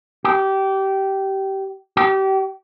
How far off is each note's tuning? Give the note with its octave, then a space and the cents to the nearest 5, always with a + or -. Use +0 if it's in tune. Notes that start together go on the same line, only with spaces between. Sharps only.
G4 -20
G4 -30